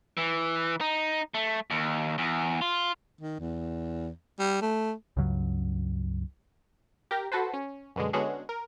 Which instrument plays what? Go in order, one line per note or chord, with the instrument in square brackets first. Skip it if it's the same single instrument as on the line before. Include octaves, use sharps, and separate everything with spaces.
[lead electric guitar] E3
D#4
A3
D#2
E2
F4
[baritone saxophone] D#3
E2
G3
A3
[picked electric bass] C#2 G2 C#3 F#3
[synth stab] G4 A#4 A#5
F#4 A4 B4 C5
C#4
F#2 B2 D3 G#3
D3 G#3 B3 C#4 F#4 G#4
A#4